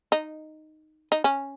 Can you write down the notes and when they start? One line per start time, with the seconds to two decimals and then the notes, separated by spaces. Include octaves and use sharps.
0.12 D#4
1.12 D#4
1.24 C#4